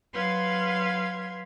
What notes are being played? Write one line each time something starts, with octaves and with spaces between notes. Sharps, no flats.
F#3 B4 F5 C6 G#6